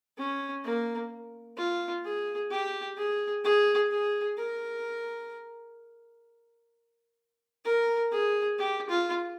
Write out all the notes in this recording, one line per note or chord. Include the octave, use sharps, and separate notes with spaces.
C#4
A#3
F4
G#4
G4
G#4
G#4
G#4
A#4
A#4
G#4
G4
F4